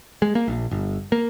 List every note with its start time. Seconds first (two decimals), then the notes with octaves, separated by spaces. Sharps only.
0.22 G#3
0.35 A#3
0.48 A#1
0.71 G1
1.12 A#3